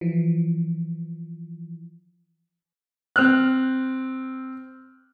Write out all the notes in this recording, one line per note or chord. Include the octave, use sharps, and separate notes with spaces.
E3 F3
C4 F6 F#6